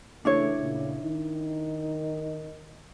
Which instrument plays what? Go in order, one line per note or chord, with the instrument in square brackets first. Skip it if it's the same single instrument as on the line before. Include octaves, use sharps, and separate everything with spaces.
[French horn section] C#3 E3 A3 [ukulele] D4 E4 C#5
[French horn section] A#2 C#3
D#3 D#4